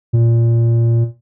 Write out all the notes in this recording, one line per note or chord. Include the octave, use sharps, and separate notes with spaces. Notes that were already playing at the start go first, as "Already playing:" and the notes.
A#2